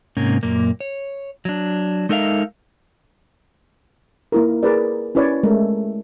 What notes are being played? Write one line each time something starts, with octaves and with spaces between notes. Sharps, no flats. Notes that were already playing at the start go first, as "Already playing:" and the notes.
G#2 C3 A#3 C#4
F#2 A#2 A#3
C#5
F#3 D4
G#3 D#4 A4 A#4 E5 F5
A#3 E4 A#4
G#4 A#4 B4 D5
C#4 E4 B4 C#5 D5
G#3 A3 A#4